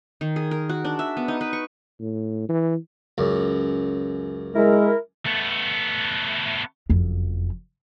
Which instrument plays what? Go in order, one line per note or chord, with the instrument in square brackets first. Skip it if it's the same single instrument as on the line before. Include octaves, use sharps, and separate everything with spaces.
[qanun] D#3
G#4
A#4
F#4
D4
E5
B3
D#4
B4
C#6
[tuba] A2
E3
[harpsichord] C#2 F#2
[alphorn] G#3 [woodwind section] E4 A#4
[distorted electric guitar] A3 B3
[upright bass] F#1 F2